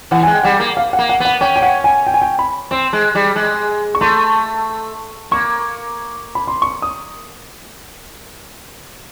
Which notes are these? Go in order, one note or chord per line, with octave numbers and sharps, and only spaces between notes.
E3 F#5
G#3 G#5
G5
G3 F#5
A#3
F5
F#5
A#3
F#5
B3 F#5
C#4 G5
G5
F#5
G#5
G5
G#5
G5
B5
C4 C6
G#3
G3
G#3
C#6
A3 C6
A#3 C#6
B5
C6
C#6
D#6